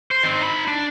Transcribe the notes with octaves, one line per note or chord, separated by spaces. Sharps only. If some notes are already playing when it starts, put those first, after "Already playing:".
C5
D#3 C4
D#4 B5
D4